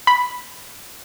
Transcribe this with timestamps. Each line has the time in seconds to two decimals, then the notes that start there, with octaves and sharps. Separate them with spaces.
0.07 B5